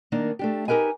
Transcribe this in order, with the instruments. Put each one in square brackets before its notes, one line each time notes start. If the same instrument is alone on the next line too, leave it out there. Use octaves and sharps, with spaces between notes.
[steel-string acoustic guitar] D#3 A#3 D4
A3 D4 G4
D#4 G4 A#4 B4 G#5